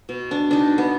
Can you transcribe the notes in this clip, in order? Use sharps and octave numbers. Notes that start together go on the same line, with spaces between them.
B2
D4
D4 D#4
B3